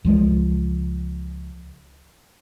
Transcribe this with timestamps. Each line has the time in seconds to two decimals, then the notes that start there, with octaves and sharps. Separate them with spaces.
0.04 C#2 F3 G#3